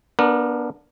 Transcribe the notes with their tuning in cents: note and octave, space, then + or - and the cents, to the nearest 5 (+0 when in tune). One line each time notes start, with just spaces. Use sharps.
B3 -30 D4 +0 A#4 +0